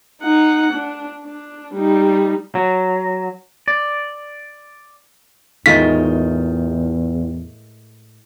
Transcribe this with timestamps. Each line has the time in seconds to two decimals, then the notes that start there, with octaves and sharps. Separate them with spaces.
0.22 D#4 F#5
0.73 D4
1.25 D4
1.74 G3 D#4
2.55 F#3
3.68 D5
5.66 E2 A2 D#3 G#3 D#4 F4 A#4 B6